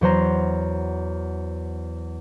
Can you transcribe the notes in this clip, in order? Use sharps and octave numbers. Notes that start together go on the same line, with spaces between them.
E2 F#3 C5 A#5